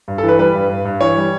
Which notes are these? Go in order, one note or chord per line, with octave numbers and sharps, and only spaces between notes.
G2
A4
E3
B4
G3 B4
G2
G2
G2
E3 C#5
G3